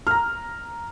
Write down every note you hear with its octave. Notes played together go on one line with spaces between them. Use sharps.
A#5 F6